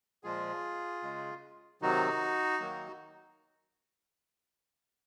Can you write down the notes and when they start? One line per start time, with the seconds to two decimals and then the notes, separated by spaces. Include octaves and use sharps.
0.24 A#2 F3 G#3 F4 G#4
1.03 C#3 G#3
1.82 C3 D#3 F#3 D#4 F#4
2.60 D#3 F#3 A#3